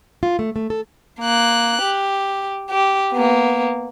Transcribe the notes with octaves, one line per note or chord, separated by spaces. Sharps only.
F4
A3
A3
A4
A#3 F#6
G4
G4
A#3 B3